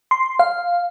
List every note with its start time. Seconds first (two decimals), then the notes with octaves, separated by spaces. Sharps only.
0.11 C6
0.39 F5